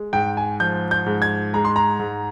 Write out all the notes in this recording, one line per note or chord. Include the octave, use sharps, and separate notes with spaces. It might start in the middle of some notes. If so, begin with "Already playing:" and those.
Already playing: G#3
G#2 G5
G#5
F3 G6
G6
G#2
G#6
G#3 A#5
C6
A#5
G#2